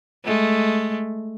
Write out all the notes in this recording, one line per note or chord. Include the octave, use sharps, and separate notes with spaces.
G#3 A3